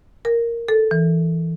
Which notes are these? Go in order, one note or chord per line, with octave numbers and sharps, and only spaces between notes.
A#4
A4
E3